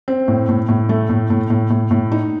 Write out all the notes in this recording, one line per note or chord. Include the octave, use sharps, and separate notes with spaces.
C4
A2
A2
A2
A3
A2
A2
A2
A2
A2
D#4